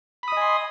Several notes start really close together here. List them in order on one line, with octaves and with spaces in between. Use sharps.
B5 D#6 D#5 G#5 C6